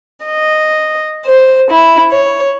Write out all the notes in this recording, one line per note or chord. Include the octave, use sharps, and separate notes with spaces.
D#5
C5
E4
C#5